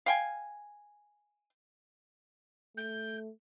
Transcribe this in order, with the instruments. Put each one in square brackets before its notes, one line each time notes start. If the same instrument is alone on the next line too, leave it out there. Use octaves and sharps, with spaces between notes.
[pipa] F5 G5 G#5
[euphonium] A3 [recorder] G6